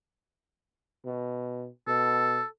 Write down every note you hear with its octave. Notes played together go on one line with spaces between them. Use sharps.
B2
B2 A4